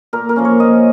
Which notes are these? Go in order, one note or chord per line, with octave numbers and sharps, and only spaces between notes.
A#2 A#4
A#4
F3 A#3 C#4
C#5
A#2 D#5